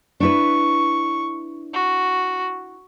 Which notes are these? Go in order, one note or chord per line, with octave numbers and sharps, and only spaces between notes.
D4 E4 B4 C#6
F#4